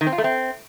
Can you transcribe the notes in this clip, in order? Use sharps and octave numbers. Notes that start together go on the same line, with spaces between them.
D#3
C4
F4
A3
C4